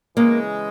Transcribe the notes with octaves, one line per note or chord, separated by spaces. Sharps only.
C#3 E3 G#3 A#3